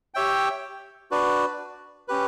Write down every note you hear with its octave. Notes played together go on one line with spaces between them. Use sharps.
G4 C#5 E5 G5
D4 F#4 B4 D5
C#4 G4 B4